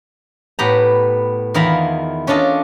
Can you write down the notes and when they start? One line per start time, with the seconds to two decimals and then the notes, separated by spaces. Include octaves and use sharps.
0.59 A2 B3 G4 G5 A#5
1.54 E2 D#3 E4 F4 A#5 B5
2.27 C#4 D4 F4 A4 D#5